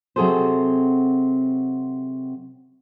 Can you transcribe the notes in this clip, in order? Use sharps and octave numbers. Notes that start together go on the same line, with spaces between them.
C3 F#3 C4 G#4 A4 C5